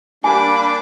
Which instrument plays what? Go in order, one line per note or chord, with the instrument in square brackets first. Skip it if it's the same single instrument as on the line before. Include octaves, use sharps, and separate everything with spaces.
[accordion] G3 A#3 D4 [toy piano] G#5 [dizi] B5 [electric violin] D6